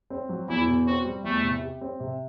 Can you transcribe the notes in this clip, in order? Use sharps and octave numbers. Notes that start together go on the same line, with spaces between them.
C4
F#3
E2 E4
B2
C4 F#4
G3
E2 A3
C3
G4
C4
C3